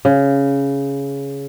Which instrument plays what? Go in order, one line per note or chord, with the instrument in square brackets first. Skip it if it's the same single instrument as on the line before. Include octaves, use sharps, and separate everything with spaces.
[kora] C#3